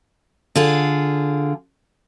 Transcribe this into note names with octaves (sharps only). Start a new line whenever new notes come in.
D3 F4 G#4